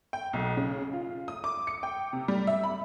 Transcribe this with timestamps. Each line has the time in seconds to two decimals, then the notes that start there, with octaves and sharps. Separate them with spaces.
0.13 G5
0.33 B1
0.57 C#3
0.93 F4
1.28 D#6
1.44 D6
1.67 C#7
1.83 G5
2.13 C3
2.28 G3
2.47 E5
2.64 B5